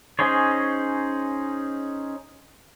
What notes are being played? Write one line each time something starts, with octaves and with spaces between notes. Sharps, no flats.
C#4 D#4 G#4 C5 C#5